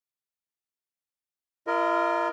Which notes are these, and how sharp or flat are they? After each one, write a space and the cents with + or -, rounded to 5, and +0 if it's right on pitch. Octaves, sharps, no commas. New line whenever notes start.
F4 -45 A#4 +0 D#5 +0